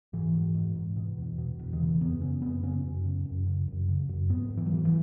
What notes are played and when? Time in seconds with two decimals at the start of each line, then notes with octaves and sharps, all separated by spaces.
0.13 G#2 E3
0.34 G#2
0.55 G#2
0.75 G#2
0.97 B2
1.18 E2
1.38 B2
1.59 E2
1.73 D#3
1.80 C#3 E3
2.01 F#2 B3
2.21 C#3 C#4
2.42 F#2 B3
2.63 C#3 C#4
2.84 F#2
3.05 C#3
3.26 F#2
3.46 C#3
3.68 F#2
3.89 C#3
4.09 F#2
4.29 G#2 B3
4.50 G#2
4.57 E3
4.66 F#3
4.71 G#2 E3
4.85 E3